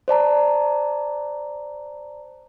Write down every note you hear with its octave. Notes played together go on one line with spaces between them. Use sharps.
C5 D5 A5 A#5